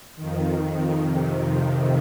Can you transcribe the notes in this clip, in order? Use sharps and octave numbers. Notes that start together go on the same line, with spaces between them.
F2 D#3
F2 C3 D#3